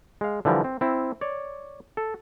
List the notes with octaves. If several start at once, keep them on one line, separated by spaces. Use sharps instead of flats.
G#3 F5
D3 E3 F3 G3 A#4
C4
C4 E4
C#5 D5
A4